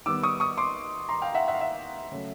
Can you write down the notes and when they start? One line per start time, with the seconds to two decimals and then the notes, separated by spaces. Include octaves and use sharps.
0.06 D#3 G3 B3 D6 E6
0.23 C#6 D#6
0.40 C#6 D#6
0.58 C6 D6
1.09 A#5 C6
1.22 F5 G5
1.35 E5 F#5
1.48 E5 F#5
1.54 F5
1.61 E5
2.12 C#3 F#3 A3